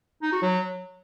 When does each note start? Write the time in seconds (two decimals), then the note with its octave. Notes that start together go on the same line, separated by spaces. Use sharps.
0.22 D#4
0.32 F#4
0.42 F#3